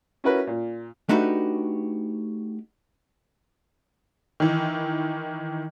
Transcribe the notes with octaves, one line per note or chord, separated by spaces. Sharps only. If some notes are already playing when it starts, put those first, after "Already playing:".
C#4 E4 F#4 A#4 B4
A#2
A3 D4 D#4 F#4 G4 B4
D#3 E3